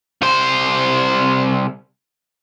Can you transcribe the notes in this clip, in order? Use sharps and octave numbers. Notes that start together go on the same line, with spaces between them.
C2 C5